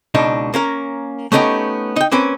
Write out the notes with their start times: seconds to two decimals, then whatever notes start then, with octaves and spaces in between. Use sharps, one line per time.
0.15 C#2 B2 D4 D#4
0.54 A#3 C#4 A#4
1.32 A3 B3 C#4 D#4 F4 G4
1.96 D#4 G5
2.12 A#3 C4 C#4 B4